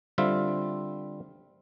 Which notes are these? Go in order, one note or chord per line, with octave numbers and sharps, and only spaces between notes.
D3 G3 C4 F4 E5